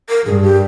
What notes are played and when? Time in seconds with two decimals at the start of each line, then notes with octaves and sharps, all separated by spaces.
0.09 A#4
0.26 G2 G#4
0.43 G4